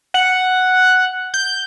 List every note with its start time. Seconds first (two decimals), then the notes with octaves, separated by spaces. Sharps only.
0.14 F#5
1.34 G6